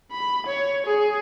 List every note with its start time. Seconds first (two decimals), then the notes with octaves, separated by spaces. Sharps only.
0.12 B5
0.46 C#5
0.86 G#4